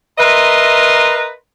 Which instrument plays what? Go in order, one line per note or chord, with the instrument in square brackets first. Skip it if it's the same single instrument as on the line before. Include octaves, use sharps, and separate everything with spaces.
[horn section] A#4 B4 D#5 E5 A#5 C6